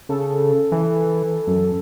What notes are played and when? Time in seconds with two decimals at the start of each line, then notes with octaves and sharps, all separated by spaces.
0.09 C#3 A4
0.72 E3
1.47 F#2